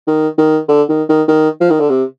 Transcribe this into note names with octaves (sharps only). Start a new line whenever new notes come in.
D#3
D#3
D3
D#3
D#3
D#3
F3
D#3
D3
C3